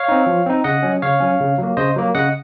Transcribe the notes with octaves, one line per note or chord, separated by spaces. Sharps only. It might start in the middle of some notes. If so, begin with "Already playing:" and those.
Already playing: C#5 F5
C4 D#4
F3
C4 D#4
C#3 D#5 F#5
F#3 C#4
C#3 C#5 F5
F#3 C#4
C#3
F#3 A#3
C#3 C5 D#5
F#3 A#3
C#3 D#5 F#5